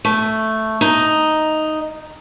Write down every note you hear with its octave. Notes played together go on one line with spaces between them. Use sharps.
A3
D#4